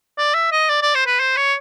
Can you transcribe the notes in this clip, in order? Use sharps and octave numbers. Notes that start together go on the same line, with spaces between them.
D5
E5
D#5
D5
D5
C5
B4
C5
C#5